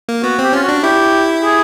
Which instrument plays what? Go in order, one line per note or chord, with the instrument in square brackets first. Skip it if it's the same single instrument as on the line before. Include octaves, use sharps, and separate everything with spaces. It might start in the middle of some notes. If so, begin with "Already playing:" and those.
[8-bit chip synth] A#3
[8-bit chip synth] B3 [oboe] F#4
[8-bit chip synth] C4 [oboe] G4
[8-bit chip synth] C#4 [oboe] F4
[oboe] F#4
[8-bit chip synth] D4
[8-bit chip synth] E4 [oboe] G4
[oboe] G#4